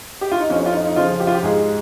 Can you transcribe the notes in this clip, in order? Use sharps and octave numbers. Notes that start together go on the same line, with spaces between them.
G4
F4
D#4
F2 C#4
F4
D#4
D#4
C#3 F3 F4
G4
F4
G4
G#2 G#4